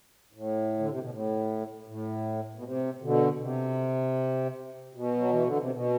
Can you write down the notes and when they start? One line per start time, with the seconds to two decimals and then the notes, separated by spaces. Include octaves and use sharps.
0.33 A2
0.79 D3
0.89 C3
1.00 B2
1.10 A2
1.87 A2
2.54 B2
2.63 C3
3.02 B2 D3
3.40 C3
4.94 B2
5.17 F#3
5.30 E3
5.44 D3
5.57 C3
5.71 B2